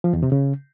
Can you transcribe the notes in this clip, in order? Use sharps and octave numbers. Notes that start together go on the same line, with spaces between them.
F3
E2
C3
C#3